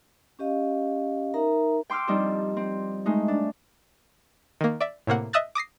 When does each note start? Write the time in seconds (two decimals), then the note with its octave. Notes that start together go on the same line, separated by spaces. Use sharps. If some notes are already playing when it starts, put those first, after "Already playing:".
0.39 C#4 G4 D#5 F5
1.34 D#4 A#4 E5 A#5
1.90 G5 C6 D6 E6 F6
2.07 F3 G3 C4 D4 D#4
2.57 C4
3.06 G#3 A3 D#4
3.28 D4
4.61 D#3 A#3
4.81 D5 E5
5.07 A2 C3 A#3 F#5
5.33 D#5 E5 D#6 E6 F#6 A6
5.55 D6 D#6 A#6 C7